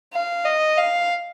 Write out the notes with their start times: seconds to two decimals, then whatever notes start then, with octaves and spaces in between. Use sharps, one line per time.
0.14 F5
0.45 D#5
0.78 F5